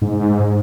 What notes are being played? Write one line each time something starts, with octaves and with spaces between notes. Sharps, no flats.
G#2